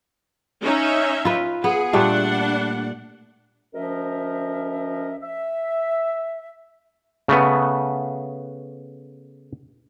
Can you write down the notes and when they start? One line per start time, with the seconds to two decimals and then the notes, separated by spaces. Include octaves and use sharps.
0.63 C#4 D#4 E5
1.25 F4 B4
1.64 B3 G#4
1.93 A#2 G3 A3 D4 F#5
3.74 D2 F3 C#4 A#4 D#5 E5
5.21 E5
7.28 C#3 A3 B3